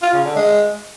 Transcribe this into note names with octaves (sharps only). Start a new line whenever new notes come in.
F4
C#3
D3
G#3